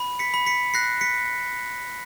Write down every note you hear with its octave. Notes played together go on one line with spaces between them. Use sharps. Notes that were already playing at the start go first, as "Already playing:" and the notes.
Already playing: B5
B6 C#7
B5
B6 C#7
F#6 A#6 C7
B6 C#7